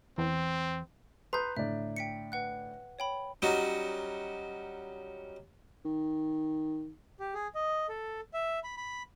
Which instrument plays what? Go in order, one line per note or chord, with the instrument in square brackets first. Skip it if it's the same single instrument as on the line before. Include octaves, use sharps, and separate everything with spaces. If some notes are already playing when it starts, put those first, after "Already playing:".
[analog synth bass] E2 [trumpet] C4
[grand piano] B4 C6 D#6 [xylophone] A#5 G6
[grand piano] A2 D3 D5 [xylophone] E5
[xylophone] G5 B6 C#7
B4 F#5 F#6
C#5 G5 B5
[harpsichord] F#3 G3 C#4 D#4 F#4
[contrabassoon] D#3
[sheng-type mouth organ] G4
G#4
D#5
A4
E5
B5
B5